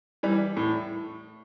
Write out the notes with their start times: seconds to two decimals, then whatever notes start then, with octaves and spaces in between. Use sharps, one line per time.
0.23 E3 G3
0.56 A2